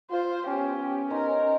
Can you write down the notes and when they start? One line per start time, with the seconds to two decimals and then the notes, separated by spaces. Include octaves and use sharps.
0.11 F4 C5
0.47 B3 C#4 G4
1.10 D#4 A#4 C5